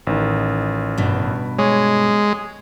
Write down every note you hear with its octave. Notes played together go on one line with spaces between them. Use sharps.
A1 D#3
G2 B2
G#3 C#5